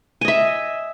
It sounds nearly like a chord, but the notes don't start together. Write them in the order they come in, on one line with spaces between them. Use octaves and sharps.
G#5 D#5 E5